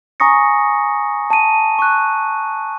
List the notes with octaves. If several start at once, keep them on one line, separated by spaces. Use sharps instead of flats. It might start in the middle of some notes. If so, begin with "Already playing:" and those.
G#5 A#5 C#6 D#6 A#6 C#7
A5 D#7
C#6 F#6